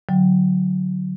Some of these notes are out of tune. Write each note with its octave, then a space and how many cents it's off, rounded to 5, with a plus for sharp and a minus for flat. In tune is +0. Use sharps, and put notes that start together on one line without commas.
D3 +0 F#3 +0 G5 +0